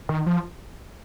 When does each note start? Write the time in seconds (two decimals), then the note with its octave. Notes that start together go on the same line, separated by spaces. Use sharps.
0.09 D#3
0.26 F3